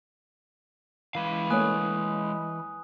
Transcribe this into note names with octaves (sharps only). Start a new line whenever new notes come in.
E3 G#3 B4 F5
A3 A#3 C#5 G#5 D#6 F#6